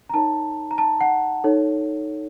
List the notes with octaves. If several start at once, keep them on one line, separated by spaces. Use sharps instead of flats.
A#5
D#4 A#4 C#5 A5
A#5
A5
F#5
D#4 A4 C#5